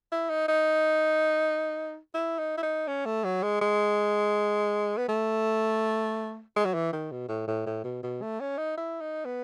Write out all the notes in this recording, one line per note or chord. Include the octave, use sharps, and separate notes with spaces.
E4
D#4
D#4
E4
D#4
E4
D#4
C#4
A3
F#3
G#3
G#3
B3
A3
G#3
F#3
E3
D#3
B2
A2
A2
A2
B2
B2
A3
C#4
D#4
E4
D#4
B3